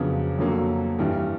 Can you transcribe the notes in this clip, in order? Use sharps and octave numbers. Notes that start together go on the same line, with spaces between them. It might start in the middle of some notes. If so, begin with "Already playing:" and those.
Already playing: F2 C#3 F#3 B3 D4
F2 D3 F#3 A#3
G2 E3 G3